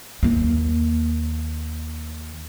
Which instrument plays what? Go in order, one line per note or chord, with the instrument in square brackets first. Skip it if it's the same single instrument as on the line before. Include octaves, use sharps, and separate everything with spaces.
[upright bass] D#2 A#3